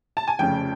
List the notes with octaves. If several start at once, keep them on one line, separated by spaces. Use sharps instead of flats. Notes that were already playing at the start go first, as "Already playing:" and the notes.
A5
G#5
F1 F2 C#3 G5